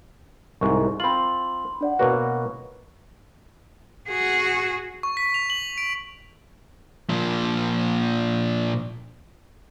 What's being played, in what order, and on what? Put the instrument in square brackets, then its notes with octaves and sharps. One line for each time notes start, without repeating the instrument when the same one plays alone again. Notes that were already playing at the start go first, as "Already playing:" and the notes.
[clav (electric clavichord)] C2 G#2 [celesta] C#6
[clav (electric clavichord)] C4 F4 [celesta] B5 C6 F#7
[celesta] D4 D5 F#5
[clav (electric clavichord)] B2 A#3 F#4 [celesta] B4 C#5 C#6
[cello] F#4 G#4
[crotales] C#6
B6
F7
F#7
D7
[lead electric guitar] A#2 F3